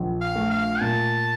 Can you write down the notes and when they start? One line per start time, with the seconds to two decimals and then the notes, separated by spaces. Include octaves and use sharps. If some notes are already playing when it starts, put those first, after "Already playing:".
Already playing: A#1
0.21 F5
0.35 A3
0.51 F5
0.81 A#2 A5